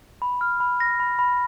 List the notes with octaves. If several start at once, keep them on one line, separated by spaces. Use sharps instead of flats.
B5
F6
B5
A#6
B5
B5